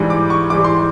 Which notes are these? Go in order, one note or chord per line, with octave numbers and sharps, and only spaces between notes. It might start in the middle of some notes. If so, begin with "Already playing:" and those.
Already playing: G#2 E3 G3
D6
C#6
G#2 E3 G3 D6
C6